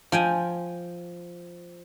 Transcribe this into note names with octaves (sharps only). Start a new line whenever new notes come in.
F3 G5 G#5